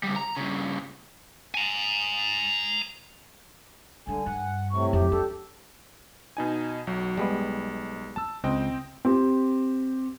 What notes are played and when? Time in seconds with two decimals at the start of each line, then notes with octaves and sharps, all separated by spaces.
0.03 C#3 G3
0.16 A#5
0.37 G2 C#3
1.54 G#5 A#5
4.07 D3 G3 D4 G#5
4.26 G2 F#5
4.71 A2 C3 C#6
4.93 F2 F#3 G4
5.12 D4 A4
6.37 B2 D#4 G#5
6.87 B1 F#3
7.17 B1 G3 G#3 B3
8.16 A5 E6
8.44 C#2 C4 D#5 G5
9.05 C4 G4